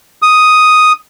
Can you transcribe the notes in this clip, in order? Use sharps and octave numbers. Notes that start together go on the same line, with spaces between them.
D#6